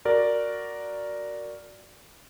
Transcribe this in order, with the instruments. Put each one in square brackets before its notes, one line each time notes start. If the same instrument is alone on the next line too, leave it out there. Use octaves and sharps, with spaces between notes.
[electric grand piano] F#4 A#4 D5